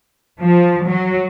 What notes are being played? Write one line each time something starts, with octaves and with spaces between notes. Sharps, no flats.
F3
F#3